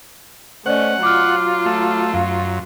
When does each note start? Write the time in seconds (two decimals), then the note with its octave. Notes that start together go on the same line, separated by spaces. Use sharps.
0.66 A3 C#4 C5 D5 D#5 F#5
1.03 F#3 F4 D6 F6
1.66 A3
2.14 F#2 F5